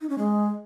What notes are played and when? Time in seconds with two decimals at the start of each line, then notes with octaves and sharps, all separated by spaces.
0.01 D#4
0.10 C#4
0.18 G#3